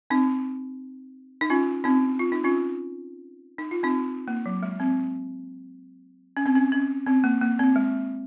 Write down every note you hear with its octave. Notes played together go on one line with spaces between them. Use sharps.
C4 D#4
D#4
C#4 F4
C4 D#4
F4
D#4
C#4 F4
D#4
F4
C4 D#4
A#3
F#3
G#3
C4
C#4
C4
C#4
C#4
C4
A#3
A#3
C4
G#3